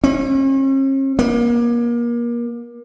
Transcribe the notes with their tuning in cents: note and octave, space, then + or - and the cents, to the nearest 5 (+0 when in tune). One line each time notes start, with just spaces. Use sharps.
C#4 -45
A#3 +30